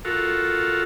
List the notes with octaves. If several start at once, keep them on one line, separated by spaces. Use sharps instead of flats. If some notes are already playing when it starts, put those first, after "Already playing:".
F4 F#4 A4 A#4